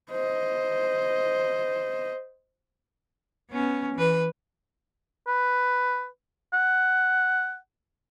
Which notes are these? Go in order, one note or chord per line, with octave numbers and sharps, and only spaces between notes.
C5 D#5
B3 C#4
E3 B4
B4
F#5